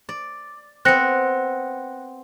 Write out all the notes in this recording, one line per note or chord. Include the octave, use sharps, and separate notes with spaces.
D5
B3 C4 F#6 A#6 C#7